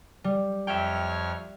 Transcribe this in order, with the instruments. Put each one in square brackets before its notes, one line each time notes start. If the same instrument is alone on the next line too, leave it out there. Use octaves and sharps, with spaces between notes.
[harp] G3
[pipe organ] F2 C#5 F6 [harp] E5 G5